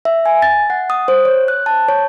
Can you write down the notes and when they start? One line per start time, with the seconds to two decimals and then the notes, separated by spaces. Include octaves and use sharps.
0.05 E5
0.26 G#5
0.42 A6
0.70 F#5
0.90 D#6
1.08 C5
1.25 C#5
1.48 F#6
1.66 A5
1.89 C#5